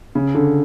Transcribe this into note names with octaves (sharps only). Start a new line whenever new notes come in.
C#3
D3